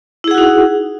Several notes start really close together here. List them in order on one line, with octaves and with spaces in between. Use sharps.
E4 G#4 F#5 F#4 D#4